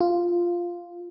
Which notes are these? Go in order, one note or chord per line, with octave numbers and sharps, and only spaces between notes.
F4